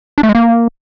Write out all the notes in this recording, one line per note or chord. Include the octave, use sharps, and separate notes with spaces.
D4
A3
G#3
A#3